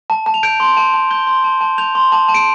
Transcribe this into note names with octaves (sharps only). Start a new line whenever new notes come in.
A5
A5
F7
G6 D7
C6
A5
A5
G6 G7
C6
A5
A5
G6 F7
C6
A5
A5
D7